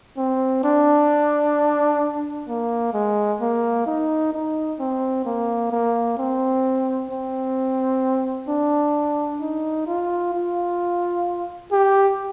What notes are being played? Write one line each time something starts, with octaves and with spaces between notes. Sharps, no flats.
C4
D4
A#3
G#3
A#3
D#4
D#4
C4
A#3
A#3
C4
C4
D4
D#4
F4
F4
G4